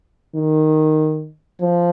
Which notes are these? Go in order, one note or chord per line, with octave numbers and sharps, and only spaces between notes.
D#3
F3